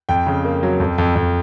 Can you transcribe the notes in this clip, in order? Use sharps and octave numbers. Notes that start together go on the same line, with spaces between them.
F2 G5
C#3
A#3
F#3
F2
F2
F2